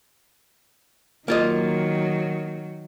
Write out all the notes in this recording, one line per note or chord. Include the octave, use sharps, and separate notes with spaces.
D#3 F#3 A#3 F4 D#5